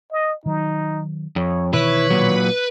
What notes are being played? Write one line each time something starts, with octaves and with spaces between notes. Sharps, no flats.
D#5
D#3 F#3 D#4
F2 C#5
B2 D#3 E3 E4 B4 C#5
A#2 F#3